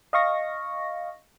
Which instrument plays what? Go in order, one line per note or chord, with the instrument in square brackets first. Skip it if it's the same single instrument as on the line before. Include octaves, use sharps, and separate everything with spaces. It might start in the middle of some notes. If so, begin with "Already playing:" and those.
[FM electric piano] D#5 F5 C#6 A#6